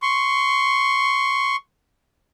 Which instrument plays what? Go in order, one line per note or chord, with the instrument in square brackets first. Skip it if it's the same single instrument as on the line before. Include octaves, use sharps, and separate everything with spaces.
[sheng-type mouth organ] C6 C#6